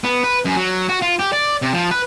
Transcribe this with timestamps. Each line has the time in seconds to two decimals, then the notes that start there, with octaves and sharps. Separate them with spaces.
0.04 B3
0.24 B4
0.45 F#2
0.57 F#3
0.89 F#4
1.02 F4
1.19 G4
1.33 D5
1.62 C3
1.73 F3
1.91 B4